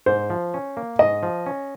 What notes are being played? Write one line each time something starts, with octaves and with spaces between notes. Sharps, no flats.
G#2 C5
F3
C#4
A#3
G#2 D#5
F3
C#4